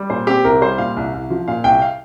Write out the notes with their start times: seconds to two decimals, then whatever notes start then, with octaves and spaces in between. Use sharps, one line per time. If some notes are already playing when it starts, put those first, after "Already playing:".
Already playing: G3
0.10 A#2 C5
0.27 C4 G4
0.44 C2 A#4
0.61 G3 C5
0.78 A#2 F5
0.96 C2
1.14 C2
1.30 F3
1.48 A#2 F5
1.64 C2 G5
1.82 F5